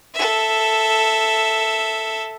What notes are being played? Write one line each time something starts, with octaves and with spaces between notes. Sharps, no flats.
A4 E5